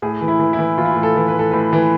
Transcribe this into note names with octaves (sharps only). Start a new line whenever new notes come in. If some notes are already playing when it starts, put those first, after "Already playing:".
A2 G#4
E3
E4
E3
E4
E3
E3 F4
E4
F4
A2
A4
E3
B4
A2 A4
A2 B4
E3